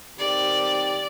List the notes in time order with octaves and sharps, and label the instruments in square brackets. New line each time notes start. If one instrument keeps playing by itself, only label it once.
[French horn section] D#3 C4 G4 [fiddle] D5